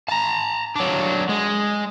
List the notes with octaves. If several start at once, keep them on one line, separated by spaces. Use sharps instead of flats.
A5 A#5
F#3 D4
G#3